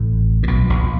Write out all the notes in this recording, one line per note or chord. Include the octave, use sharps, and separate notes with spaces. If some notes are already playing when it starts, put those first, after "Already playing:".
Already playing: A1 A2
A#2
B1 B2
A#1 A#2